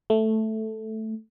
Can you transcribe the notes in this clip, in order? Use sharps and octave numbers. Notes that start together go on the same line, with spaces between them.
A3